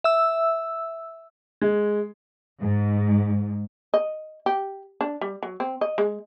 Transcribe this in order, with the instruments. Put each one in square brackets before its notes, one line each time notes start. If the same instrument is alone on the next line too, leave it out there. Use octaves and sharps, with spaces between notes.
[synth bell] E5 E6
[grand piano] G#3
[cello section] G#2
[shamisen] D#5
G4
D4
G3
F#3
C4
D#5
G#3